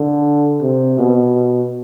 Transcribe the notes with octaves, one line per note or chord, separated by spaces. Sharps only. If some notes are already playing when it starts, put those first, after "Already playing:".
Already playing: D3
C3
B2